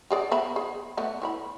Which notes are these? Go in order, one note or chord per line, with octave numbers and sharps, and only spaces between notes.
G4 G#4 D5
B3 E5 B5
G#4
A3 B3
E4 C#5 B5